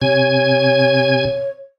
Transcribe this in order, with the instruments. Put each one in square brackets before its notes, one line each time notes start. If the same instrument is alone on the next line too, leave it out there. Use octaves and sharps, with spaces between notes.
[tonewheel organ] C3 G#5 G#6 [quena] C#5